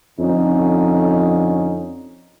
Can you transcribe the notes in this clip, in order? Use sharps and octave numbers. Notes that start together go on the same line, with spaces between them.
F2 D3 C#4 D#4